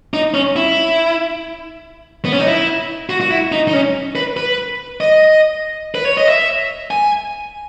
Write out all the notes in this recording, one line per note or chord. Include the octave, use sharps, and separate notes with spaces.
D#4
C#4
E4
B3
C#4
D#4
E4
F#4
F#4
E4
D#4
D#4
C#4
B4
B4
D#5
B4
C#5
D#5
E5
G#5